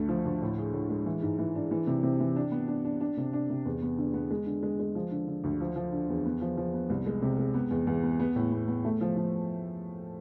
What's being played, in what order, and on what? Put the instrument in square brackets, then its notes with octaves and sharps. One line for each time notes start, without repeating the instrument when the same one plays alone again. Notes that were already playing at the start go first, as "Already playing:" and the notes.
Already playing: [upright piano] D2 A3
F3
D2
A2
G#4
A2
G#3
E3
G#2
E3
D4
E3
C3
C3
E3
D4
B3
D4
D4
D4
C3
D4
C3
E2
B3
D3
B3
G#3
D3
G#3
G#3
F3
D3
D3
D2
F3
F3
D3
E2
B3
F3
F3
B3
C2
G#3
C3
G#3
B3
E2
E2
B3
B3
A2
B3
B3
A3
F3
F3